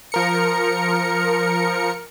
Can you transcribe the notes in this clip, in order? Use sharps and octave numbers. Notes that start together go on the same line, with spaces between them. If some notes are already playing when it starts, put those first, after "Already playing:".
F3 A#4 C#7